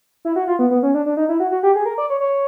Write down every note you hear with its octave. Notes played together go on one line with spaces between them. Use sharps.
E4
F#4
F4
B3
B3
C#4
D4
D4
D#4
E4
F#4
F#4
G4
G#4
A#4
D5
C#5
C#5